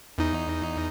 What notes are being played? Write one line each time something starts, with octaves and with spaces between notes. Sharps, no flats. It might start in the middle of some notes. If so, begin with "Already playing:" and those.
E2 D#4